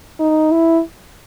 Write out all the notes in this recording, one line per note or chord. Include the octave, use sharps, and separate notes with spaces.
D#4
E4